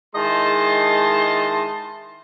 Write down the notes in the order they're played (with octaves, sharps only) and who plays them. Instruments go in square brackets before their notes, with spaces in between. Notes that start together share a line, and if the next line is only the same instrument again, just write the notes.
[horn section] D#3 G#3 E4 D#5 A5 C6